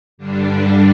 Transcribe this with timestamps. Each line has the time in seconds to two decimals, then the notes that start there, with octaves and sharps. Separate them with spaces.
0.18 G2 D3 G3 D4